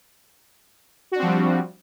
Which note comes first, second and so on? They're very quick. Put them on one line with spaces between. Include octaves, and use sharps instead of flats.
F#4 D4 C4 F3 G3